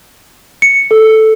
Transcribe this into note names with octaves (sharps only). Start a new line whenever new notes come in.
C#7
A4